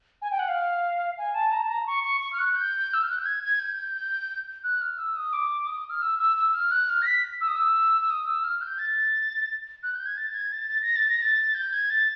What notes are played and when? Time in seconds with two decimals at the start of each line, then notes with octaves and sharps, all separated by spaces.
0.22 G#5
0.31 G5
0.39 F#5
0.48 F5
1.18 G#5
1.34 A5
1.52 A#5
1.62 A5
1.69 A#5
1.87 C#6
2.04 C#6
2.21 C#6
2.33 F6
2.39 F#6
2.56 G6
2.94 E6
3.03 F6
3.10 F#6
3.18 G6
3.26 G#6
3.43 G#6
3.60 G6
3.77 G6
3.95 G6
4.64 F#6
4.81 F6
4.98 E6
5.16 D#6
5.33 D6
5.67 D#6
5.90 F6
6.02 E6
6.19 E6
6.37 E6
6.54 F6
6.71 F#6
6.89 F6
7.02 A#6
7.06 B6
7.41 E6
7.47 D#6
7.55 E6
8.02 E6
8.10 D#6
8.26 E6
8.44 F6
8.61 G6
8.79 A6
9.83 F#6
9.95 G6
10.06 G#6
10.17 A6
10.30 A6
10.34 G#6
10.52 A6
10.69 A6
10.82 A#6
10.96 A6
11.09 A#6
11.22 A6
11.55 G6
11.73 G#6
11.90 A6